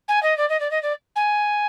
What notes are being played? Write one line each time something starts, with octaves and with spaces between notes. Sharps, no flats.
G#5
D#5
D5
D#5
D5
D#5
D5
G#5